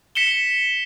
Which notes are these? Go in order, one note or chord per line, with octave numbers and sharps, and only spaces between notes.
B6 C#7 E7 G7